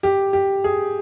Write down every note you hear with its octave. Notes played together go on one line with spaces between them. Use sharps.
G4
G4
G#4